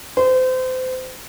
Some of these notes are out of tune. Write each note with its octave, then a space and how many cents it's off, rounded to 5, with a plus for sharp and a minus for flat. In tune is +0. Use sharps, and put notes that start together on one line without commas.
C5 -30